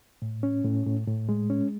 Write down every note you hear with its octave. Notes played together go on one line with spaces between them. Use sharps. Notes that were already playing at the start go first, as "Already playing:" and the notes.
A2
C#4
A2
A2
A2
G#3
C#4